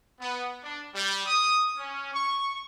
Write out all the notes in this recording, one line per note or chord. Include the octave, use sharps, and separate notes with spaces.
B3
D4
G3
D#6
C#4
C#6